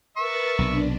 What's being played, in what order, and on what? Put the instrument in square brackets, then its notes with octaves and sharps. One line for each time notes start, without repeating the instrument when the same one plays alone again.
[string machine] A#4 B4 A6 [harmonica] E5 C#6
[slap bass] B1 C3 [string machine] D4